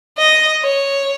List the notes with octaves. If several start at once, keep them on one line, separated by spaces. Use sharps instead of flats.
D#5
C#5